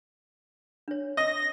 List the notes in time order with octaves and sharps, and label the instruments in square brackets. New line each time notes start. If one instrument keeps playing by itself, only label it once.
[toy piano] D4 C#5
[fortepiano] D#5 [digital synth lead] A#6